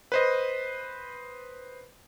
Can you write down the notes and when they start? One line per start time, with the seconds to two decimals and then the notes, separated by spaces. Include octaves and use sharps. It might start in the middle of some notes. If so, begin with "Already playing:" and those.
0.12 B4 C5 D#5